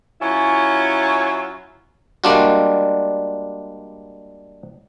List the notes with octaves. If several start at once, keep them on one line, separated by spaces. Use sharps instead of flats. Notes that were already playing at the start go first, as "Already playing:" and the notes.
F#3 C#4 E4 F4
G3 G#3 A#3 D4 F4 F#4